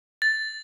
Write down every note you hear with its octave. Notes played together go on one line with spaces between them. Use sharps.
A6